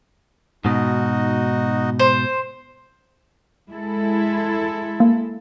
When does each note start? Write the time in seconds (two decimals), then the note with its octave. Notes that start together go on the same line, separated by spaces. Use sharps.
0.65 G#2 B2 D#4 F#4 D#5
1.99 C5
3.71 G#3 E4 A4
5.00 A#3